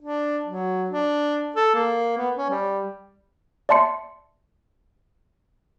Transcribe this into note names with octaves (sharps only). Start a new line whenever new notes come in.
D4
F#3
D4
A4
A#3
B3
C#4
G3
D5 E5 A5 C6 C#7